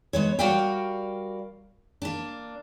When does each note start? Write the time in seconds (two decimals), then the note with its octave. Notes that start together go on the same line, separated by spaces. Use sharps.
0.13 G#3 B3 C#5
0.39 G3 F#4 A#4 D5 F5 G5
2.02 A#3 D4